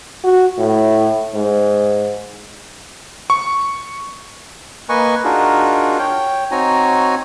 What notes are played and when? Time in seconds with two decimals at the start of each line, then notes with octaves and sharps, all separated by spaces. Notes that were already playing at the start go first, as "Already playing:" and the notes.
0.24 F#4
0.58 A2
1.34 G#2
3.30 C#6
4.89 A#3 B4 D#5 G#5 C#6
5.24 D4 D#4 F4 F#4 G#4 A#4
5.99 C#5 G5
6.51 C4 D#4 F#4 C#5 G#5 A#5